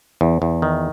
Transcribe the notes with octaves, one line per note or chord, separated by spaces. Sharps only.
E2
E2
D#3